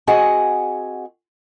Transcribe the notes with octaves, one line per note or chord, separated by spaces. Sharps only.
C4 F#4 G#4 D#5 F#5 G#5